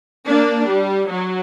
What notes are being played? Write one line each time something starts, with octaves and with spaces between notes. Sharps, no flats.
A#3 D4
G3
F#3